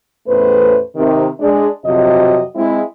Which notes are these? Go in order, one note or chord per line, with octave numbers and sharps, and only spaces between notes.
E2 A2 A3 C#4 B4 C5
C3 D#3
G#3 D4
F2 C3 F#3 F#4 D#5
G#3 C4 E4